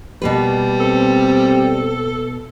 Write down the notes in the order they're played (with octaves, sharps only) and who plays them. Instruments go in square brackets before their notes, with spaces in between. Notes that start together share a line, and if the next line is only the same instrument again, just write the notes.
[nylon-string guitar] B2 A#3 B4 [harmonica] G3
[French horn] C4 [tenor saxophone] A4